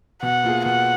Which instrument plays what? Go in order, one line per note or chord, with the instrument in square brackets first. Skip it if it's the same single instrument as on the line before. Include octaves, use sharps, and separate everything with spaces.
[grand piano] B2 [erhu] F#5
[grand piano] A#3 F4 G#4
[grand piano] B2 [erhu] F#5